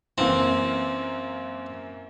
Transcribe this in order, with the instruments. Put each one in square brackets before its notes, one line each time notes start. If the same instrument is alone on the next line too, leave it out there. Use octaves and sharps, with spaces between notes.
[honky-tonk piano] F#2 E3 A#3 [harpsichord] C4